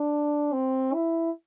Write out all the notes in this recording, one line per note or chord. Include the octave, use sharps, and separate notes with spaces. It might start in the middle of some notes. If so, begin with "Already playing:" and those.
Already playing: D4
C4
E4